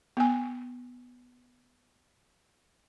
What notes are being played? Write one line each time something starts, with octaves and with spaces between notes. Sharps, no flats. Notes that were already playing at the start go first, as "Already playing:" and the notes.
B3 G#5